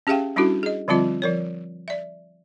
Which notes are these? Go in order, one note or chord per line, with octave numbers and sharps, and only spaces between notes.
C#4 G4 G#4 E5 F5 G5
G3 C#4 D4 E4 F#4 A4
G#4 D#5
D3 F3 G3 C4 F4 D#5
F3 A#4 C#5
D5 E5